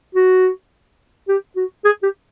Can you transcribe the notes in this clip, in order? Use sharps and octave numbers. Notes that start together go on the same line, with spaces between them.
F#4
G4
F#4
G#4
G4